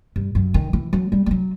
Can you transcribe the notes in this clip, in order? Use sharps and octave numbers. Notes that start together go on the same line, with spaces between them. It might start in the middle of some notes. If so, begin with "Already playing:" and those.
G2
F#2
D#3
E3
F#3
G3
G3
F#3